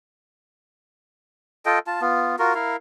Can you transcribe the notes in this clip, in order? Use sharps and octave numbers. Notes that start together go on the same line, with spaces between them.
F4 A4 D#5 G5
F4 A5
B3 F4
F4 F#4 A#4
E4 A#4 F5